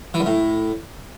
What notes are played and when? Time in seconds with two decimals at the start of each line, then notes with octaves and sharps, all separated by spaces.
0.14 E3
0.20 F#2
0.26 A2